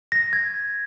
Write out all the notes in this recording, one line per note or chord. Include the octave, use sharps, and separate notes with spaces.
A#6
G#6